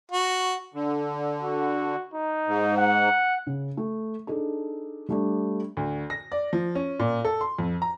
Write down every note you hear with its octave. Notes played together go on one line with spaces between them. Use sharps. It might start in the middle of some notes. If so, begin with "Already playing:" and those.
F#4
D3
F#4
D#4
G#2
F#5
C#3
A3
D4 D#4 G#4 A4
G3 A3 D4
D2
A#6
D5
F3
C#4
A#2
A4
C6
F2
A#5